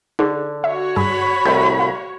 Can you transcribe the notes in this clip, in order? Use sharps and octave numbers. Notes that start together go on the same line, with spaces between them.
D3 D#4 G#4 C5
F#4 C#5 E5
G2 G#4 G#5 B5
C2 A2 D#5 G6
F5 F6 F#6